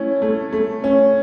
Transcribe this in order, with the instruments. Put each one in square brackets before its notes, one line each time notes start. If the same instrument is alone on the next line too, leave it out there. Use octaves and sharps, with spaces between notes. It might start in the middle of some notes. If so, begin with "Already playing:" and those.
Already playing: [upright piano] A3 C#4 E4
A3
A3
C#4